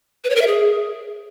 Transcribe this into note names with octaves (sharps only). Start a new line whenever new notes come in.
B4
C#5
A#4
E5
G#4